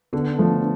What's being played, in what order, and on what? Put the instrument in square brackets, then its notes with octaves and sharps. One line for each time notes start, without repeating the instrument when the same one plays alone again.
[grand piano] D3 [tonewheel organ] B3 D4
[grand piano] F3 A3